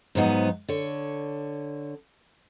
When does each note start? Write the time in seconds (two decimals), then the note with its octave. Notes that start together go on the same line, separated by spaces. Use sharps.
0.15 G#2 F3 F#3 B3 D#4
0.69 D3 C#5